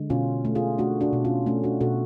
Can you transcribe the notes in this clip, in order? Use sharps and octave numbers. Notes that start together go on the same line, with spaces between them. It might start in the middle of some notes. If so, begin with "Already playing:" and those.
Already playing: D3 G#3
B2 C#4 F4
A3
F4 G#4
A3 D4 F#4
D4 F#4
B2
C#4 F4
A3 C#4
D4 F#4
B2 F#4 A4